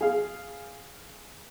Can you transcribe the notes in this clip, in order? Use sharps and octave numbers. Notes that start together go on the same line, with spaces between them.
G#4 F5